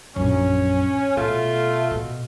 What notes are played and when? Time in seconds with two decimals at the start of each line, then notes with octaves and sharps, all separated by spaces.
0.16 A#1 F#2 C#4
1.17 B2 A3 F4
1.91 B2